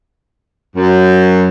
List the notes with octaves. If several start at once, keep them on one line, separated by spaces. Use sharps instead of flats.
F#2